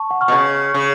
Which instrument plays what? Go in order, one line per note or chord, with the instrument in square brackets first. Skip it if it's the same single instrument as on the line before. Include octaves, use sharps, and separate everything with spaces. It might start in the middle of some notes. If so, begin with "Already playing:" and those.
Already playing: [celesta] A5 C#6
F#5
C#6 F6
[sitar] B2
C#3
C#3